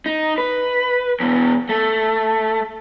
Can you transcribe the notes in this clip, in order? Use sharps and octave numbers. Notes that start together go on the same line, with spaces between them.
D#4
B4
E2 B2
A3